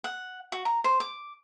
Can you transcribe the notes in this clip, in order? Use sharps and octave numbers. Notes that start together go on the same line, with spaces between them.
F#5
F#4
A#5
C5
D6